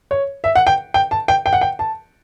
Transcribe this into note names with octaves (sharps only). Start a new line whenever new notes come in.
C#5
E5
F#5
G5
G5
A5
G5
G5
F#5
G5
A5